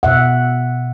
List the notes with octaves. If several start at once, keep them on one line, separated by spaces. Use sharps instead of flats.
B2 E5 F#5